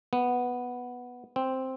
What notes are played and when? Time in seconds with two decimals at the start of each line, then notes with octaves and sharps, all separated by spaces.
0.13 B3
1.36 C4